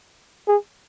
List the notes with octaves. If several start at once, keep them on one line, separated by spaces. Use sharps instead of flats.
G#4